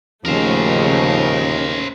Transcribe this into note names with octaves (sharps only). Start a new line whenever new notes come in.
D#2 G#2 C#3 F3 A3 A#4 C5